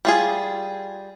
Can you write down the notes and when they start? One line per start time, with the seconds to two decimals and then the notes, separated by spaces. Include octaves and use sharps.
0.05 G3 F4 G#4